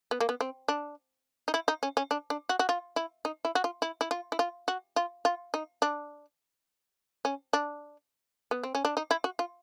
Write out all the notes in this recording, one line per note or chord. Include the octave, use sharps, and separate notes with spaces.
B3
A#3
B3
C4
D4
D#4
E4
D#4
C#4
C#4
D4
D4
F#4
F#4
F4
E4
D#4
E4
F#4
F4
E4
E4
F4
E4
F4
F#4
F4
F4
D#4
D4
C#4
D4
B3
C4
C#4
D4
D#4
E4
F#4
F4